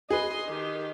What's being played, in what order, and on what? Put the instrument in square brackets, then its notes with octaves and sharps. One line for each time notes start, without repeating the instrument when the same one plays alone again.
[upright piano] G#4 B4 [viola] D#5 C6
[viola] D#3 G4